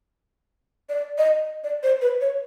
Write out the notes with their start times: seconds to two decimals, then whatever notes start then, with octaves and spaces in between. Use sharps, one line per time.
0.89 D5
1.18 D#5
1.64 D5
1.83 C5
2.01 B4
2.21 C#5